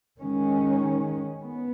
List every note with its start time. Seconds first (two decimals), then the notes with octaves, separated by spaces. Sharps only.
0.20 D#3 G#3 C#4
1.43 B3